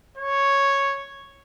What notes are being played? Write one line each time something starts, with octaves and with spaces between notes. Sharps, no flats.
C#5